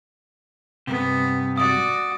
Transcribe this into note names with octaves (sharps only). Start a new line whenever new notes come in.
G2 C3 B3
F#4 D5 D#6